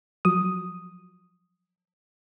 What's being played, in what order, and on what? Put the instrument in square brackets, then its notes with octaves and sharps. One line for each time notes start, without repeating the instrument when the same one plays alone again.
[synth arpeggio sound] F3 F#3 D#6